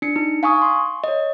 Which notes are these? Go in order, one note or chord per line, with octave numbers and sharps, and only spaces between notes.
D4 C#7
D#4
F5 G#5 C#6 D#6
C6
C#5 D#5